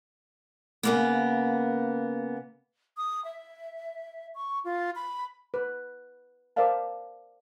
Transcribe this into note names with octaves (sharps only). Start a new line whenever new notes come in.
C#3 A#3 B3
D#6
E5
C#6
F4
B5
B4
A#4 C5 D5 E5 F5 A5